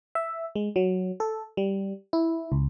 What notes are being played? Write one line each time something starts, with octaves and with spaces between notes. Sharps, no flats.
E5
G#3
F#3
A4
G3
E4
C#2